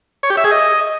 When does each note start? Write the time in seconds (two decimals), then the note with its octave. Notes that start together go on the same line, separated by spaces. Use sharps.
0.23 C#5
0.30 G4
0.37 E5
0.44 G#4
0.51 D#5